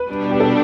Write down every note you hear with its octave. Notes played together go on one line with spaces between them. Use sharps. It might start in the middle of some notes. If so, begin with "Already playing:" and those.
Already playing: B4
B2 G3 D4
G4
A4